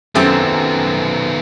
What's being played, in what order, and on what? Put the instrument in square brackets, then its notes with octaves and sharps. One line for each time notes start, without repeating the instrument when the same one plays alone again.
[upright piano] F#2 [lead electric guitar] D#3 B3 [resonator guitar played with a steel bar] A3 C4 G4